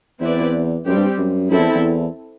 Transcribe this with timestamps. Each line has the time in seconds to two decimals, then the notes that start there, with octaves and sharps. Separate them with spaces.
0.20 E2 C4 E4 B4 D5
0.85 F#2 G3 C4 G4
0.96 G2
1.18 F#2
1.50 F#2 C4 E4 A4
1.59 E2
1.75 E2